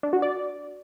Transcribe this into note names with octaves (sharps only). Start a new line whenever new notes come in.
D4
F#4
D5